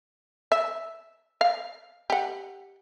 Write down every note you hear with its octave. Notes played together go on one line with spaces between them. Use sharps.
E5
F5
G4 F#5